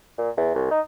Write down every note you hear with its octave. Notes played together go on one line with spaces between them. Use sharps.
A#2
E2
C2
D#4